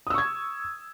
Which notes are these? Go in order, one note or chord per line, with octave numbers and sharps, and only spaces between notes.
C#6 D#6 E6 G#6